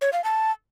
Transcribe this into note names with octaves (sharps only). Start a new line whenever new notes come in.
C#5
F5
A5